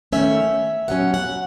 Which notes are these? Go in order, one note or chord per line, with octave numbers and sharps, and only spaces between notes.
D#3 A3 C#4 E5
B2 F#3 C#4 F#5
F#5